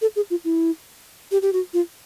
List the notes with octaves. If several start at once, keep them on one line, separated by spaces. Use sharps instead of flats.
A4
G#4
F4
E4
G4
G4
F#4
F4